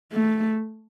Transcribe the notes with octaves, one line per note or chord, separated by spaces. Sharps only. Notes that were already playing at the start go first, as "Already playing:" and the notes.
A3